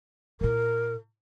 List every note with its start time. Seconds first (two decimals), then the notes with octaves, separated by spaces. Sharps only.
0.41 A#2 E4 A#4